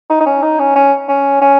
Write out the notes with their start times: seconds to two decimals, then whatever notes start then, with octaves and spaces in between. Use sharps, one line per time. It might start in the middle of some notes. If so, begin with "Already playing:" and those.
0.10 D#4
0.21 D#4
0.26 C#4
0.42 D#4
0.59 C#4
0.76 C#4
1.08 C#4
1.41 C#4